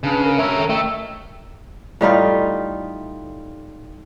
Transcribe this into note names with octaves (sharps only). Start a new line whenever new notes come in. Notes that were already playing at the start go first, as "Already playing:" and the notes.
C#3 D4 B4
A#4
A#4 C#5 E5
D#3 A4
A3 D#5 G5 E6
A2 G3 D#4 F4